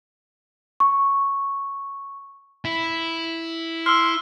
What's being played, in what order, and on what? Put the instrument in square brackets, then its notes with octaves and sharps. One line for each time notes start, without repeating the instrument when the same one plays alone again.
[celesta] C#6
[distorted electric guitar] E4
[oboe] C6 [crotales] E6 F6